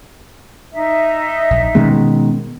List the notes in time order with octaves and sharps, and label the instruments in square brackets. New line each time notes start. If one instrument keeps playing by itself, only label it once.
[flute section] D#4 E5
[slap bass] A#1
[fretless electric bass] B2 D#3 G#3 [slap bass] B3 C#4